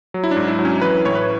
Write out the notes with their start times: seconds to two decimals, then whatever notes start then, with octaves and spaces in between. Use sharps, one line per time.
0.14 F#3
0.24 E4
0.31 D4
0.36 G#2
0.48 E4
0.59 F#3
0.65 C#4
0.81 E3 B4
1.05 A2 C#5
1.15 B4